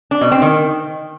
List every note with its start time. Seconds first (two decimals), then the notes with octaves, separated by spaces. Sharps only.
0.11 D4
0.21 B2
0.32 C4
0.42 D#3